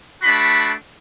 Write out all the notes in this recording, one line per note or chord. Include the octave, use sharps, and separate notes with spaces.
A3 D4 F#4 B5